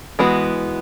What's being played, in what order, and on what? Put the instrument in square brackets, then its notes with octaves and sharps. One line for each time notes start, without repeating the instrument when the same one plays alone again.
[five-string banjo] E3 G#3 B3 F#4